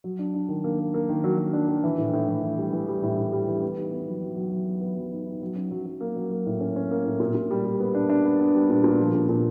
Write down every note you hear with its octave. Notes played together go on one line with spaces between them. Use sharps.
F#3
D4
D4
D#3
A#3
A#3
A#3
D#3
F#3
F#3
D4
D#3
E3
A2
A2
E3
E3
G3
E3
G3
A2
A2
G3
E3
B3
D#4
B3
F#3
F#3
F#3
F#3
B3
B3
F#3
D#4
D#4
F#3
C#4
F#3
F#3
A#3
F#3
A#3
A2
C#4
C#4
A#3
A2
A#2
A#2
G3
G3
B3
D4
D4
B3
B3
G3
A#2
A#2
F3
A#2
A#2